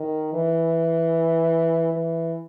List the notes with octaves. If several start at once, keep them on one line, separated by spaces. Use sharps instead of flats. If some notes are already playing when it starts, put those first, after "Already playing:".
Already playing: D#3
E3
E3